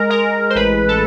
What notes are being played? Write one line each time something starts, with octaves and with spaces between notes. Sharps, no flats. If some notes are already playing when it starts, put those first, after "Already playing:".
Already playing: G#3 A#4
G#3 A#4
C5
A1 B4
A4